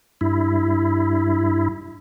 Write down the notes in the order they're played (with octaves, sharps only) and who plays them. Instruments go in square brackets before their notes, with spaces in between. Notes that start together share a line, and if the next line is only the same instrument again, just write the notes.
[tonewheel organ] G2 E4